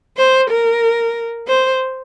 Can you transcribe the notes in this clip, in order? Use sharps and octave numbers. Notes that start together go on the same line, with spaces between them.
C5
A#4
C5